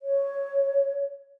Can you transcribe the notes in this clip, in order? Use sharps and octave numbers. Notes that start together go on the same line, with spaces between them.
C#5